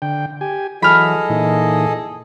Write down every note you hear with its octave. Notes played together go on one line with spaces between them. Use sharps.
D3 G5
G4 G#5
E3 F#3 G#4 A4 D#5 B5 F6
A#2 E3 D#4